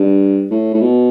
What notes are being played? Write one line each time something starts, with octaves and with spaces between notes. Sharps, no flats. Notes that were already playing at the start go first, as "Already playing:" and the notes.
Already playing: G2
A2
A2
B2